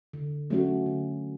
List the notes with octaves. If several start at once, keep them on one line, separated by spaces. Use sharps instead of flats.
D3
F#3 A3 C#4 F#4
D3